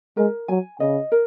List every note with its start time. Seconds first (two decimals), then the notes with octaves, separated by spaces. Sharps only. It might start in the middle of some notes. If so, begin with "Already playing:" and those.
0.17 G#3 A#4
0.48 F#3 G#5
0.80 C#3 D#5
1.12 A#4